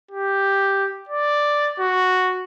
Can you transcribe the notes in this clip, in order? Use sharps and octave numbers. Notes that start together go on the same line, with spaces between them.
G4
D5
F#4